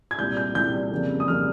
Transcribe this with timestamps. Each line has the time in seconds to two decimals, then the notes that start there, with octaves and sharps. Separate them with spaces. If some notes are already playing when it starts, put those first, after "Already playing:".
0.11 G#6
0.18 C2 A#2 G3 G6
0.37 G6
0.55 C2 A#2 G3 G6
0.91 F2 C#3 G3 A#3
1.20 D#6
1.28 F2 C#3 G3 A#3 F6